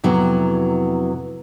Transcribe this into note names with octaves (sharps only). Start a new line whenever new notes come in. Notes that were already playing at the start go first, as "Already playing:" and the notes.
F2 C3 F#3 B3 E4 A#5